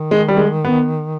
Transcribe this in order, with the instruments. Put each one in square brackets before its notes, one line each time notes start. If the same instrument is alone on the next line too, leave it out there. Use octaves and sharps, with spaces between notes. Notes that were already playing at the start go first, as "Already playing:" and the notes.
Already playing: [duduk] D#3
[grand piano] G#3
G3
G#3
B3